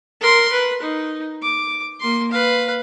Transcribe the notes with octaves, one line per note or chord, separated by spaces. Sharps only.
A#4 C6
B4
D#4
D6
A#3 C6
B4 F5